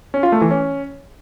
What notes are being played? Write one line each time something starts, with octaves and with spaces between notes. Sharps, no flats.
C#4
F4
A3
E3
C#4